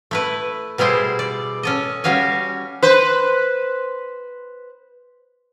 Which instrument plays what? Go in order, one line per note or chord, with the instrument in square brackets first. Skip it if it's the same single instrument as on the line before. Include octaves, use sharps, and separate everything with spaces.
[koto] A3 E4 B4
B2 G3 E4 G#4 C5
D5
C#4 A4 D#5
G3 C#4 F#4 F5 G#5
[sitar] B4 C5